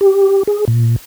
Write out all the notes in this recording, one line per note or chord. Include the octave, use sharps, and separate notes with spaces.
G4
G#4
A#2